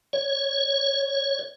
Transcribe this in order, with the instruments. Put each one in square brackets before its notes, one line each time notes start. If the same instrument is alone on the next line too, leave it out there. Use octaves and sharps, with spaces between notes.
[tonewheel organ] C#5